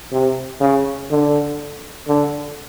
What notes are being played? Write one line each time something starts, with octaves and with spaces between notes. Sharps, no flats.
C3
C#3
D3
D3